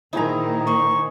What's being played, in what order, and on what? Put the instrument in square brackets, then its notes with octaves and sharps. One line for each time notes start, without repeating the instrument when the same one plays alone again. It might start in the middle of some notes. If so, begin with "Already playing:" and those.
[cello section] A#2 D#3 [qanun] F3 E4 [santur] D#4 G#4 A#5
[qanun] A#3 C5 [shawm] C#6